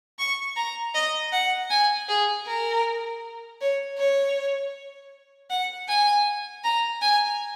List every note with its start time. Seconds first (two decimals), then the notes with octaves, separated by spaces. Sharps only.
0.19 C#6
0.57 A#5
0.95 D#5
1.33 F#5
1.71 G#5
2.09 G#4
2.47 A#4
3.61 C#5
3.98 C#5
5.51 F#5
5.88 G#5
6.64 A#5
7.02 G#5